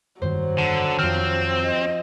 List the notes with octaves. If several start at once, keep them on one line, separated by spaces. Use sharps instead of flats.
F1 G2 D#3 F#3 C5
D3
F2 D#3 F3 C4 F6
D#5